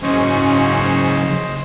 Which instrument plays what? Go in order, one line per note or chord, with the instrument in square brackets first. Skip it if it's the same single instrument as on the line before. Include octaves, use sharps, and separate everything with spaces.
[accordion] G#2 C#4 C#6 [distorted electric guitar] C#3 F#3 [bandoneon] C5 D#5